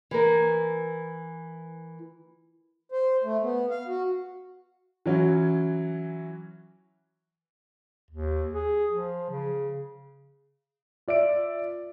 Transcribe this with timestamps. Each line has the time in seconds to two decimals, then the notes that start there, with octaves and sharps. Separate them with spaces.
0.11 E3 A#3 A#4
2.92 C5
3.24 A3
3.42 B3
3.70 F5
3.87 F#4
5.06 E3 F#3 C#4 F#4
8.11 D#2
8.53 G#4
8.91 F3
9.31 C#3
11.08 F4 D5 E5 D7